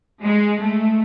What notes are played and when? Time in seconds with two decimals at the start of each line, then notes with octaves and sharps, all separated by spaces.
0.23 G#3
0.60 A3